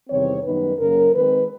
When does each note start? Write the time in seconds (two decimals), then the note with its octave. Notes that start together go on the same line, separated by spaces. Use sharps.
0.09 E2 C3 D#3 G3 C4 C#5
0.44 F#2 D#3 G3 B3 D#4 B4
0.79 F#2 C#3 F#3 A#3 A#4
1.14 D#3 G#3 C4 B4